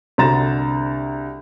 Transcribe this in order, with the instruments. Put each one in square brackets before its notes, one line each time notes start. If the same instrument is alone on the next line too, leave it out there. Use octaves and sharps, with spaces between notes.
[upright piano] C2 D3 F#4 A#5 A6 E7